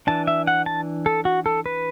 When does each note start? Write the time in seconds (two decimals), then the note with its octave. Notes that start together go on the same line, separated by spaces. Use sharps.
0.07 E3 D4 A5
0.27 E5
0.47 F#5
0.66 A5
1.06 A4
1.25 F#4
1.46 A4
1.66 B4